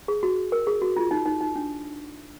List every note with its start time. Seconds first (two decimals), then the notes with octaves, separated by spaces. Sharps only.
0.08 G#4
0.23 F#4
0.52 A#4
0.67 G#4
0.82 F#4
0.97 F4
1.11 D#4
1.26 D#4
1.41 D#4
1.56 D4